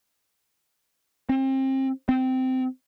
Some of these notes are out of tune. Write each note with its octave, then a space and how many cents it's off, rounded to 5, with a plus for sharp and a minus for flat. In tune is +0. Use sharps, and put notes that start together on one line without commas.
C4 +30
C4 -15